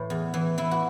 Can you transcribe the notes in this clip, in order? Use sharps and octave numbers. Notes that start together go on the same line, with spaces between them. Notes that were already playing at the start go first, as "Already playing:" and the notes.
Already playing: A2 E3
E2
E3
E3 E4
F#4